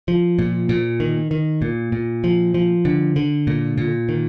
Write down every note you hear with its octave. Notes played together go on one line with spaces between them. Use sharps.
F3
A#2
A#2
D#3
D#3
A#2
A#2
F3
F3
D3
D3
A#2
A#2
D#3